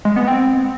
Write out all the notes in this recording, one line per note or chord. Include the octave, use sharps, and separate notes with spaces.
G#3
B3
C4